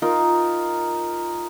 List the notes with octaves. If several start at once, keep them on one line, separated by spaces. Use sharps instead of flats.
D#4 F4 A#4